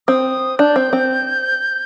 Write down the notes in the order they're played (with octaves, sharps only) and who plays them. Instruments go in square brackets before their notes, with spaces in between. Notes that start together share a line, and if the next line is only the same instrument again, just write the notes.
[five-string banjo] C4 [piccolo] D#6
[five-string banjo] D4 [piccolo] G6
[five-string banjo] C4
C4